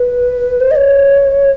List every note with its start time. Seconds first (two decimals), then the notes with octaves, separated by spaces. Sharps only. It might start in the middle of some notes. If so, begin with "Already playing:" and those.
Already playing: B4
0.61 C5
0.71 D#5
0.76 C#5